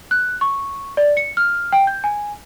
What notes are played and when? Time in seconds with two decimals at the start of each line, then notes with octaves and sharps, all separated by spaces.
0.11 F#6
0.41 C#6
0.97 D5
1.17 C#7
1.37 F6
1.72 G5
1.87 G6
2.04 G#5